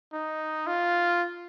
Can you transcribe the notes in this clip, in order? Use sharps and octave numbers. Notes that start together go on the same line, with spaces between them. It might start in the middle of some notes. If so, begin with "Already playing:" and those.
D#4
F4